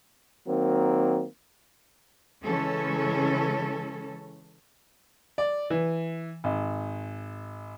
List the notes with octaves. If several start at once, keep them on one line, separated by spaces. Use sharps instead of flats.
D#3 F#3 A#3 C4
C#3 E3 G#3 C#4 A4
D5
E3
G#1